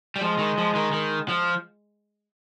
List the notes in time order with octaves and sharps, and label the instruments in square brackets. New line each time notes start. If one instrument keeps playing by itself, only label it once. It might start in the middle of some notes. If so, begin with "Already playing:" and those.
[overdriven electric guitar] G3
[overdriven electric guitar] F3 [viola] G#3
[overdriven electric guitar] D#3
F3
D#3
D#3
F3